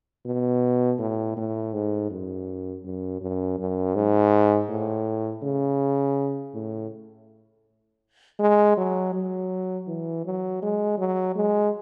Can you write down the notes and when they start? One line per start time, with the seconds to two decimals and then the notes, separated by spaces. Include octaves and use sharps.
0.26 B2
0.99 A2
1.37 A2
1.74 G#2
2.11 F#2
2.85 F#2
3.21 F#2
3.59 F#2
3.95 G#2
4.69 A2
5.43 C#3
6.54 A2
8.39 G#3
8.77 F#3
9.14 F#3
9.88 E3
10.25 F#3
10.62 G#3
10.98 F#3
11.36 G#3